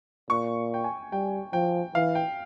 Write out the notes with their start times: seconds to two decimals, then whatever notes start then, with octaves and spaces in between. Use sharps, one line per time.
0.30 A#2 C#6
0.74 G5
0.84 G#5
1.12 G3 G5
1.53 F3 G5
1.95 E3 F5
2.15 G5